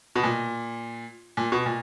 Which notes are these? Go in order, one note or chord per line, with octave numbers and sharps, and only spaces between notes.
B2
A#2
A#2
B2
A#2